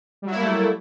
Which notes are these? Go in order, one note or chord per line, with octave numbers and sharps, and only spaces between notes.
F#3 G3 A3 A#3 E4